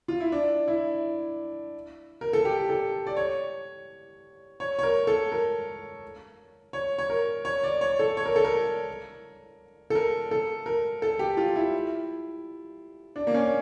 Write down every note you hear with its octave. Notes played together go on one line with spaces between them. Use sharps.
F4
E4
D4
E4
A#4
A4
G4
A4
D5
C#5
C#5
C#5
A#4
A4
A#4
C#5
C#5
A#4
C#5
D5
C#5
A4
C#5
A#4
A4
A#4
A4
A#4
A4
A#4
A4
G4
F4
E4
D4
A#3
C#4